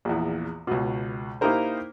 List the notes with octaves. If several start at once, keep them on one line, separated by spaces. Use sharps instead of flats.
A#1 E2
C#2 B2
A#3 D#4 E4 G4 A#4 C5